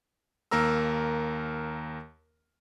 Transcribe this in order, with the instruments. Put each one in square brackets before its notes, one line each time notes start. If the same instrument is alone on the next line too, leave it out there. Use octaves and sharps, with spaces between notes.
[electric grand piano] D#2 A#3 A#4 A#5 E6